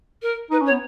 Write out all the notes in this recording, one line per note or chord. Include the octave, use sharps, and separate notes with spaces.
A#4
D#4 B4
C#4 C#5
B3